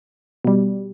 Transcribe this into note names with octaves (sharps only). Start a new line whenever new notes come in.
B2 G3